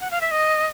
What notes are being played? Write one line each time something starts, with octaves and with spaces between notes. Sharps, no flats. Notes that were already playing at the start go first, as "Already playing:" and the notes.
F#5
F5
E5
D#5